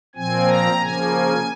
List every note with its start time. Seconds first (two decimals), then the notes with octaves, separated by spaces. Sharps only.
0.15 A#2 F3 C4 G#5
0.48 A#5
0.81 C#3 F3 A#3 G#5